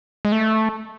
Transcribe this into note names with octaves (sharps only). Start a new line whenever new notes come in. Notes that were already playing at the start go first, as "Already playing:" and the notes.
G#3
A3